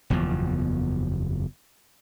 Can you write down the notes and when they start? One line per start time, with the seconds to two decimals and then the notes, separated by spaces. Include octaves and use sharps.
0.10 F#1 E2 B2 F3